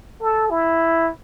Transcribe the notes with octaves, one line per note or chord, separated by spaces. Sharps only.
A4
E4